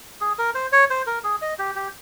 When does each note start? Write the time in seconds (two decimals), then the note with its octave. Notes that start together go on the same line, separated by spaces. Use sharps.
0.21 G#4
0.38 A#4
0.55 C5
0.72 C#5
0.90 C5
1.07 A#4
1.24 G#4
1.42 D#5
1.59 G4
1.76 G4